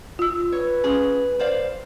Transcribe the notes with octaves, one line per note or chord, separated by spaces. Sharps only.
F4 E6
B4 C#5
C#4 G#4
C5 D5 F5